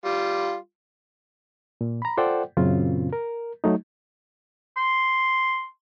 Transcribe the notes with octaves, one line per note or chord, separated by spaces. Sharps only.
G3 F4
A#2
A#5 B5
F4 A4 C5 D5 F#5 G5
F#2 A#2 C#3 C4 F4
A#4
F#3 A3 D#4
C6